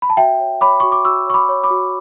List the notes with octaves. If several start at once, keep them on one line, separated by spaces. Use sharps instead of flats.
B5
A5
F#4 E5 G5
C#5
C#5 B5 D6
F#4 C#6
D6
F#4 C#6 E6
C#5 C#6
B5 D6
C#5
B5 D6
F#4